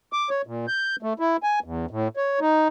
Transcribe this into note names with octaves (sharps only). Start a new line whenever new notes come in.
D6
C#5
A#2
G6
A3
E4
G#5
E2
A2
C#5
D#4